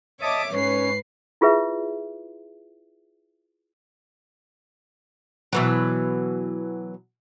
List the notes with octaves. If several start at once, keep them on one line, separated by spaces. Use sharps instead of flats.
C#5 D#5 E5 A5 D6 D#6
G#2 C#4 B4 C#5 C7
E4 F4 G#4 B4 E5
B2 E3 F#3